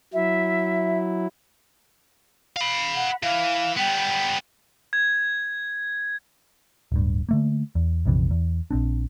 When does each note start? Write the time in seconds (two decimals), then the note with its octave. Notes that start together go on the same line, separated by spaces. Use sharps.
0.14 F#3 E4 E5
2.57 F5 B5
2.96 F#5
3.23 E3 F5
3.77 G3 B3 G5
4.93 G#6
6.92 D1 G2
7.29 D3 A3 A#3
7.75 E2
8.05 A#1 F2 C3 E3
8.31 E2
8.71 A#1 C4 D4